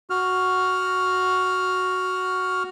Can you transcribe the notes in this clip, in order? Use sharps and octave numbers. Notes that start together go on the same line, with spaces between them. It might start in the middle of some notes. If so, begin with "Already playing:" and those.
F#4 F6